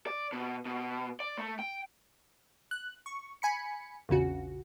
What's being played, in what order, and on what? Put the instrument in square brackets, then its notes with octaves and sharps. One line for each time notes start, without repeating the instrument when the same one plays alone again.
[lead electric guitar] D5
B2
B2
D5
A3
G5
[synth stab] F#6
C#6
G#5 B5 C#7
A#1 E2 C#3 F#4